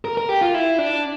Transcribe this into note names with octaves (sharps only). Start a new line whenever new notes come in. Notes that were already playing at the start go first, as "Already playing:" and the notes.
A#4
A#4
G4
F4
E4
D4